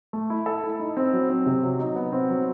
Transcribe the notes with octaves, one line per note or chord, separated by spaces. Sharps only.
A3
E4
A4
E4
D#4
C4
F#3
C4
C3
F#3
D#4
B3
C4
F#3